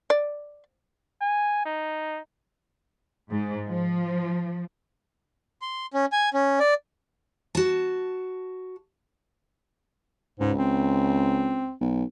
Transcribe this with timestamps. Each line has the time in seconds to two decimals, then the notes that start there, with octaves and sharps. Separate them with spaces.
0.10 D5
1.21 G#5
1.66 D#4
3.31 G#2
3.69 F3
5.62 C6
5.94 C#4
6.12 G#5
6.34 C#4
6.60 D5
7.55 F#4 A5
10.40 C#2 G#2
10.58 C4
11.81 B1